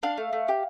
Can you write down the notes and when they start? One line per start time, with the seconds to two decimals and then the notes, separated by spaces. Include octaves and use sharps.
0.03 D4 F5
0.17 A3
0.33 A3
0.48 G4